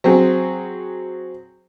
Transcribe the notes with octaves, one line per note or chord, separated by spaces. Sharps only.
F#3 C4 G#4